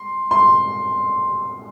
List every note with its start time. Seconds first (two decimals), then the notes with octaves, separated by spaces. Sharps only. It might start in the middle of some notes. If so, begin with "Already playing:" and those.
Already playing: C6
0.31 C6